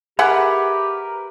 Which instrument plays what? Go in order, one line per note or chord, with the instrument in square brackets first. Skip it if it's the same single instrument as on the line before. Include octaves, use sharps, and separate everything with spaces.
[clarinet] G4 [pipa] G#4 E5 F#5 [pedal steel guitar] A#4 B4